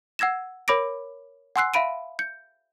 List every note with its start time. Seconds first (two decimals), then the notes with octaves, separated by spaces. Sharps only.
0.19 F#5 E6 G#6 A#6 E7
0.68 A#4 C#5 B5 D6 A#6 D7
1.56 F#5 G#5 C6 E6 F#6 C7
1.74 E5 F5 B5 D7 D#7
2.19 G6 C#7